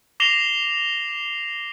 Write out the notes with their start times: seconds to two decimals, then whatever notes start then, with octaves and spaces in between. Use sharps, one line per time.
0.20 D6 A#6 C7 E7 F7 G7